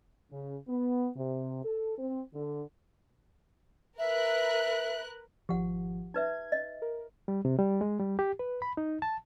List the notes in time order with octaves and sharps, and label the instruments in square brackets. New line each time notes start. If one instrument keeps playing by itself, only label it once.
[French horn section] C#3
B3
C3
A4
C4
D3
[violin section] A#4 B4 F#6 [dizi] E5
[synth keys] G#1 F3 [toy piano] G4 F#5
[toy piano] D#4 B4 E5 [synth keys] G#6
[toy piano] D#5
[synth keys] A#4
[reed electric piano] G3
C3
G3
G#3
G3
G4
B4
B5
D#4
A5